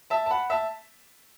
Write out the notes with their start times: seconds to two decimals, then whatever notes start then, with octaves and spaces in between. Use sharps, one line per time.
0.10 E5 A5
0.26 A5
0.31 F#5 B5
0.50 E5 A5